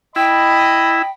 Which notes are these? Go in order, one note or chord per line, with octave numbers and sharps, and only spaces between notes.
E4 D#5 G5 B5